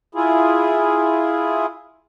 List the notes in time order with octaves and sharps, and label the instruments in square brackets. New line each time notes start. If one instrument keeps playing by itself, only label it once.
[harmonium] E4 F4 G#4